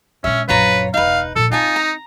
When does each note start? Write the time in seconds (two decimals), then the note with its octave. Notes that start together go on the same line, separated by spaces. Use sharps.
0.24 A#1 G#3 C#4 E5
0.49 A#1 F#2 F4 B4 C#5 A#5
0.94 E1 C#2 D#4 B4 F5
1.36 A#2 F3 A4
1.52 C4 D#4 F4 G#5 A5
1.76 A#5